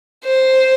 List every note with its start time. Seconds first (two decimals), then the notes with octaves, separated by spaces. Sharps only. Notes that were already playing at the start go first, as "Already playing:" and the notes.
0.25 C5